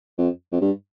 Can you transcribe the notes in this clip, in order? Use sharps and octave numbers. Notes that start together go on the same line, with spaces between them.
F2
F2
G2